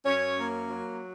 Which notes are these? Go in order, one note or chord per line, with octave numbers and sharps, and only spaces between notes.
F#2 C#4 C#5
A#3
F#3